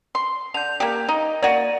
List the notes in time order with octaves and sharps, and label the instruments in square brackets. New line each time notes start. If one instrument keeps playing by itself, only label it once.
[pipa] C6
[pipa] D3 [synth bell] G6 F7
[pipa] A#3 G4
[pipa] D#4 [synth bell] D#5
[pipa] A#3 F#4 [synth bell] D5 D#7